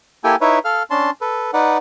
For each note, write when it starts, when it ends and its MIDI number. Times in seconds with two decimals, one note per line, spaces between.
0.24 0.36 58
0.24 0.36 64
0.24 0.36 67
0.24 0.36 69
0.24 0.36 79
0.24 0.36 80
0.41 0.59 63
0.41 0.59 64
0.41 0.59 71
0.41 0.59 73
0.41 0.59 76
0.65 0.83 69
0.65 0.83 77
0.65 0.83 89
0.90 1.10 61
0.90 1.10 62
0.90 1.10 81
0.90 1.10 84
1.21 1.51 69
1.21 1.51 71
1.53 1.78 63
1.53 1.78 71
1.53 1.78 74
1.53 1.78 78